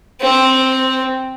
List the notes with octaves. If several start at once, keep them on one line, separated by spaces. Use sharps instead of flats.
C4